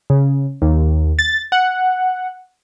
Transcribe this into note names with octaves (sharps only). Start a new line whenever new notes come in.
C#3
D#2
A6
F#5